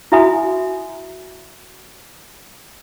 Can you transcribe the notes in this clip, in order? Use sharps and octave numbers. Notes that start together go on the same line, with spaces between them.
E4 F#4 E5 G#5 B5 D#6